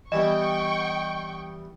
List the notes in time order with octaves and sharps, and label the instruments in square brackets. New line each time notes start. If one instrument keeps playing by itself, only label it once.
[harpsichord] E3 G3 B3 [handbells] D#5 [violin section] G5 C#6